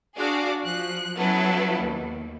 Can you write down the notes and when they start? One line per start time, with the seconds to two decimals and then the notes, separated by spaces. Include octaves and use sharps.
0.17 D4 F#4 G#4 D5 F5 D6
0.65 F3 F#6
1.16 F#3 B3 C#4 E4 A4 B4
1.80 D#2